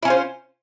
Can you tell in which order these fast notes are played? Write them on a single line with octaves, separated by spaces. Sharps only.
E4 C#4 F4 C5